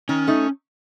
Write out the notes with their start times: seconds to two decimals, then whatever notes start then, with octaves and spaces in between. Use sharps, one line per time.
0.09 D#3 C#4
0.27 A3 D#4